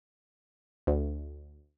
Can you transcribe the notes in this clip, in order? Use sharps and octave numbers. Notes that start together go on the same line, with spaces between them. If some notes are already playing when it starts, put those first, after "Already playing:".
D2